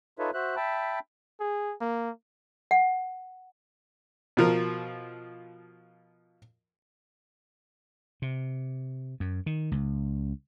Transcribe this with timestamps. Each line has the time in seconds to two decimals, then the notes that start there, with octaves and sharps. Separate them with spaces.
0.19 D#4 F4 A4 B4 C#5 E5
0.34 F#4 C5 E5 F#6
0.56 E5 G5 A5 B5
1.40 G#4
1.81 A#3
2.71 F#5
4.37 B2 F3 A#4
8.22 C3
9.20 F#2
9.46 D#3
9.72 C#2